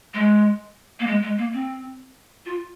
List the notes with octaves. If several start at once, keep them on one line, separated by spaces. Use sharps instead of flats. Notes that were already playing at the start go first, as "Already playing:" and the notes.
G#3
A#3
G#3
G#3
A#3
C4
F4